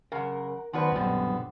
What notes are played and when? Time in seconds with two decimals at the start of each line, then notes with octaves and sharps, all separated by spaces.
0.12 F#2 C#3 A#4 F#5
0.73 F#2 D#3 B3 F#4 B4 C5 D5 A5
0.92 A#1 F#2 B2 D3 G3 C4